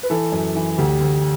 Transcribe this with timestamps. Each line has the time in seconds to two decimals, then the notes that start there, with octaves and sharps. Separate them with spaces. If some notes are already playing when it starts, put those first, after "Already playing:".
0.03 B4
0.10 E3 A4
0.32 F#2
0.55 E3
0.78 D2 G4
1.01 D2